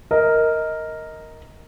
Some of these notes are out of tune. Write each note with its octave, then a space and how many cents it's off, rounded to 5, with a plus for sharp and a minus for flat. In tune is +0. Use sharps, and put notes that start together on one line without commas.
A#4 -5 D#5 +15